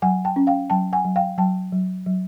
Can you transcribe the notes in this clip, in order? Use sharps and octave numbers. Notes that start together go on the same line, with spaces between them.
F#3 F#5 G#5
G5 A5
C#4
F5 G5
F#3 G5 A5
F#5 G#5
F#3
F5 G5
F#3 G5 A5
F#3
F#3